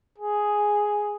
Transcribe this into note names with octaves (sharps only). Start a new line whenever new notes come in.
G#4